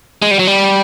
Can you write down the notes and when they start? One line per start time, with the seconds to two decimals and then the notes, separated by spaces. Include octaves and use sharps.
0.22 G#3
0.31 G3
0.39 F#3
0.47 G3